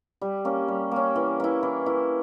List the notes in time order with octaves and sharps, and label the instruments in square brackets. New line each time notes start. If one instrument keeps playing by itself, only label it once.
[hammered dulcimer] G3
A#3 C#4
G3
A#3 C#4
E3
A#3 E4
E3
A#3 E4